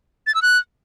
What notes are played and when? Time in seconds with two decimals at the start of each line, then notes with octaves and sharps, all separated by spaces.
0.27 A6
0.35 E6
0.42 F#6